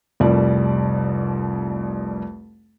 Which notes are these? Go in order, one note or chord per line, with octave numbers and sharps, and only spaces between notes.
F1 C2 F2 G3 D5